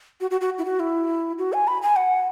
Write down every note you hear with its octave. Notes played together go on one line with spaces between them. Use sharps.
F#4
F#4
F#4
E4
F#4
E4
F#4
G#5
B5
G#5
F#5